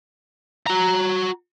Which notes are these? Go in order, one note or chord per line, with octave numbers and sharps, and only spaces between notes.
F#4 A#5